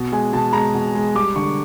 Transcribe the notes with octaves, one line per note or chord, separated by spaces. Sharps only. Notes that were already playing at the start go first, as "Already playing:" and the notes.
Already playing: B2
G#3 G#5
B2 A5
G#3 A#5
B2
G#3
G3 D6
D3 C#6